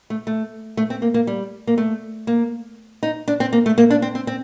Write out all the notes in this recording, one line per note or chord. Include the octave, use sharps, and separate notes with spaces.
A3
A3
A3
C4
A#3
A#3
G3
A#3
A3
A#3
D#4
D4
C4
A#3
A3
A#3
D4
C4
C4
C4